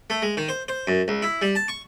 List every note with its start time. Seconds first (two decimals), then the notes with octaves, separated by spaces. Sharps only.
0.10 A3
0.22 G#3
0.37 D#3
0.49 C5
0.68 C5
0.87 F#2
1.08 C#2
1.22 E4
1.42 G3
1.55 A5
1.68 C#6